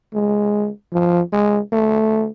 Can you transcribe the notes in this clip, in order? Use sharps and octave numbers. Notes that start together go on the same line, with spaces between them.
G#3
F3
G#3
A3